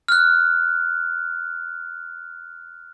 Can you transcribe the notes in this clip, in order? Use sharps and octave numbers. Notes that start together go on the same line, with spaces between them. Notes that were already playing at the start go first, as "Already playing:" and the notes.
F6 F#6